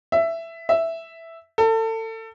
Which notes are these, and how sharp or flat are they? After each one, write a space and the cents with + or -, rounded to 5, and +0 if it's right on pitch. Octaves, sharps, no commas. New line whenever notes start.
E5 +10
E5 +0
A4 +30